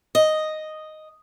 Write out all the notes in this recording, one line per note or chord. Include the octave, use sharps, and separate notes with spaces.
D#5